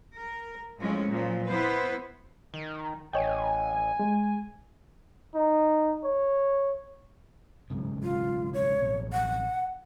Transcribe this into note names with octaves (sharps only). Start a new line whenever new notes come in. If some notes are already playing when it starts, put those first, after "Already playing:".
A#4
A2 F3 G#3 A3 C#4
A#2 F3 F#3
B3 E4 B4 C5
D#3
A1 C#5 D#5 G5 G#5
G#3
D#4
C#5
B1 G#2 C#3
F4
C#5
A1 B2
F#5